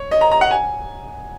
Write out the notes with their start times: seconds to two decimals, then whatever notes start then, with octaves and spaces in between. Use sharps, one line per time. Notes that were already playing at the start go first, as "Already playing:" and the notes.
Already playing: C#5
0.11 D#5
0.21 A#5
0.31 A#5
0.41 F#5
0.51 G#5